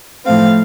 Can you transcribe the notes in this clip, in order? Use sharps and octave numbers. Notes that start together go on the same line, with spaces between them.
A2 F3 A3 C4 F5